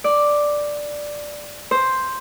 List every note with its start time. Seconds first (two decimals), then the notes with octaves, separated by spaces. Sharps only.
0.04 D5
1.71 C5